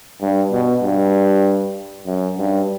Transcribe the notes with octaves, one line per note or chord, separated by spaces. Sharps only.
G2
B2
G2
F#2
G2